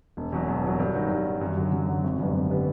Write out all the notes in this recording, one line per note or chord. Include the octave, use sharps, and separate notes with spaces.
E1
E2 B2 F#3
E1
E2 B2 F#3
G2
D#3 F#3
G2
D#3 F#3
F#2
D3 F#3
F#2
D3 F#3
G#1
F#2 D3 G3 B3
G#1
D3 G3 B3